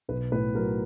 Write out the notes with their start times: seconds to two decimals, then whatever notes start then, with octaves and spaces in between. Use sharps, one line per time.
0.09 B1 B4
0.32 A2 B4
0.55 F#3 A#4